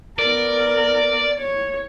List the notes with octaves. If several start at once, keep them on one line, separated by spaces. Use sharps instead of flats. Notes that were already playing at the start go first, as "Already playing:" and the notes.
B3 A#4 D5
C#5